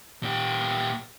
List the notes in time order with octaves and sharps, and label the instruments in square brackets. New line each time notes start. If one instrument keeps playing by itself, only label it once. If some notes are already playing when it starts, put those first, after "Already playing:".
[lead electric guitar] A#2 G4